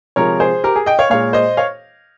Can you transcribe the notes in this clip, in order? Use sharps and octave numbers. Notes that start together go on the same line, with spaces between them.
C3 F3 G#3 A#4 C#5
G#4 C5
G4 A#4
G#4
D#5 G5
C#5 F5
A#2 G#3 C#5 F5
C5 D#5
C#5 F5